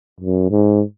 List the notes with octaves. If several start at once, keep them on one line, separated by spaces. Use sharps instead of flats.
F#2
G#2